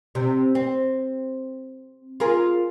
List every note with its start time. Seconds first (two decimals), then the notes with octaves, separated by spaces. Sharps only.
0.15 C3
0.55 C4
2.20 F4 G#4 A#4